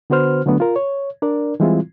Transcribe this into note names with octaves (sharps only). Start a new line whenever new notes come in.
D3 B3 F#4 B4 C5 F6
D3 F#3 A3 B3 D4
F4 A#4
C#5
D4 A#4 D5
E3 G3 G#3 C4 E4 F4